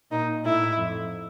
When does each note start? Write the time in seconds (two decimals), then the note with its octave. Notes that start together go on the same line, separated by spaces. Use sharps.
0.11 A#2 D#4
0.44 A2 E4
0.78 F2